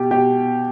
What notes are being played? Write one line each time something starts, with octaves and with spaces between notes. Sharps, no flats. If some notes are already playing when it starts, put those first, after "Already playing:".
Already playing: B2 G4
B2 G4